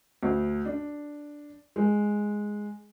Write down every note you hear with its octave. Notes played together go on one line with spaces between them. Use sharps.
D2
D4
G#3